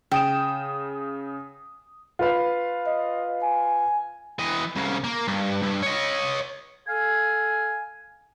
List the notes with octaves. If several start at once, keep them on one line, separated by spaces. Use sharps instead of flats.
C#3 G5 D#6 E7
F4 B4 F5
D#5
G#5
E3 D#5
C2 C#3
A#3
G2
G2
C#5 D#5
A4 F5 G#5